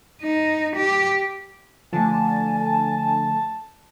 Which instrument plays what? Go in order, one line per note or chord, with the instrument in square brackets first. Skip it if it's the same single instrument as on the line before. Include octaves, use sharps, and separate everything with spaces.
[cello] D#4
G4
[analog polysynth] D3 [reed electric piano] F3 A3 [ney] G#5 [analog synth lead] A5